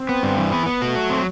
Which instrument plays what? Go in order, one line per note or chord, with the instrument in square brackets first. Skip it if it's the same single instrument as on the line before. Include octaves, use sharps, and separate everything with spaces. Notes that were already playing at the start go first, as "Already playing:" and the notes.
Already playing: [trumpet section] C4
[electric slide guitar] B3
G2
E3
B3
B3
[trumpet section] A3 [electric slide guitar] F#4
[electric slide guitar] F#3
C4